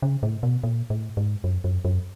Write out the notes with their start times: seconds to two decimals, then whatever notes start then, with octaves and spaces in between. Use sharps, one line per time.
0.02 C#3
0.23 A2
0.43 B2
0.63 A#2
0.90 A2
1.17 G#2
1.44 F#2
1.64 F#2
1.85 F#2